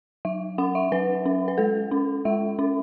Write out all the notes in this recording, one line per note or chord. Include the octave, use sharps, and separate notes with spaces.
F#3 E5
C#4 F#5
E5
F#3 B4
C#4
B4
G#3 A4
C#4
G#3 E5
C#4